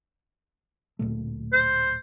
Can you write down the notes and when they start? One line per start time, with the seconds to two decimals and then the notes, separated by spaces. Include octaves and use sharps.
0.99 D1 A#2 A3
1.53 C5